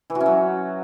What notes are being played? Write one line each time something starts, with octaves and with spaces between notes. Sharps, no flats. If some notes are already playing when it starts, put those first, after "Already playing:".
E3
F#4
C#4
F#3